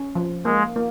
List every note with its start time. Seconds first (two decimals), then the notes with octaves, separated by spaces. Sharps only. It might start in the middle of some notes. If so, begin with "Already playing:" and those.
Already playing: C#4
0.15 F3
0.45 G#3 A#3
0.76 A#3